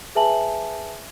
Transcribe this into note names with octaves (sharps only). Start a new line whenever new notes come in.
G#4 B4 E5 G#5 A5 F#7